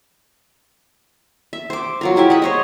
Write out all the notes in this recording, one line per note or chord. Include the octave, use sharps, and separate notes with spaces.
E5
C5 D6
F#3 F4 A#4
G#3 E4 G4 E5
D#5 F#5 B5
C5 C#5 D#5